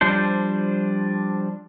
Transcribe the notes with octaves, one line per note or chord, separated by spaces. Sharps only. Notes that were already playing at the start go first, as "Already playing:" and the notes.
F3 G3 D4 C5